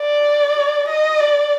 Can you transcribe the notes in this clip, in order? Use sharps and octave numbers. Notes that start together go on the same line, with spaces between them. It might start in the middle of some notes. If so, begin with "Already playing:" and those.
Already playing: D5
D#5
D5